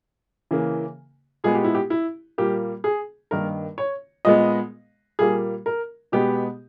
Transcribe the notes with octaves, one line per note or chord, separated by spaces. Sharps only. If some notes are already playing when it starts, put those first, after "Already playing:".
C#3 E3 A#3
A#2 G#3 B3 G#4
G4
E4
G4
E4
A#2 G3 A#3 G4
G#4
G2 D#3 A#3 A#4
C#5
A#2 G#3 B3 D#5
A#2 G3 A#3 G#4
A#4
B2 G#3 B3 G4